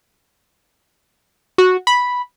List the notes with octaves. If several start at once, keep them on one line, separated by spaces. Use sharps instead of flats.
F#4
B5